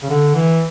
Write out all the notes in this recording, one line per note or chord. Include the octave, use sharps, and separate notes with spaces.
C#3
D3
E3